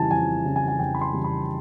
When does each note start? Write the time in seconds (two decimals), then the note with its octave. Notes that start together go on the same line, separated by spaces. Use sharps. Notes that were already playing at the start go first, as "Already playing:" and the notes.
Already playing: F2 C#3 E3 G3 G#5 A5
0.11 F2 G#5
0.45 C#3 E3 G3
0.56 G#5
0.68 G#5
0.79 F2 G5
0.95 B5
1.01 C6
1.13 C#3 E3 G3
1.24 B5